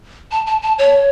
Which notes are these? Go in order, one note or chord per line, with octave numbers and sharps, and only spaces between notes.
A5
A5
A5
C#5